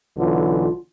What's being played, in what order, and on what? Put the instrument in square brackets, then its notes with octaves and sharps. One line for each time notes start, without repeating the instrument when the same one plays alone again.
[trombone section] B1 D3 E3 [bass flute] F4